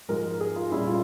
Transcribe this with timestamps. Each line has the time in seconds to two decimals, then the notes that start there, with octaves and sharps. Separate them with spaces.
0.09 G#2 F3 G#3 A#4
0.41 G#4
0.56 F4
0.71 A#2 G3 C#4 E4
0.88 F4